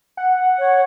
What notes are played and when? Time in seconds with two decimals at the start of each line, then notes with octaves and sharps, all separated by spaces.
0.17 F#5
0.58 C#5